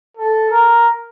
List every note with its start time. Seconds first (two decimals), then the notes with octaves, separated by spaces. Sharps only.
0.17 A4
0.51 A#4